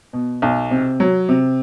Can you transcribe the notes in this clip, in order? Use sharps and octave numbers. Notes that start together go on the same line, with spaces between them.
B2
B1
C3
F#3
C3